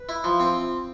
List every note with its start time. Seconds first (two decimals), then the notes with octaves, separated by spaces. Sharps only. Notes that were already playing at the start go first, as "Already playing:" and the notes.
Already playing: B4
0.09 E4
0.24 F3
0.40 C4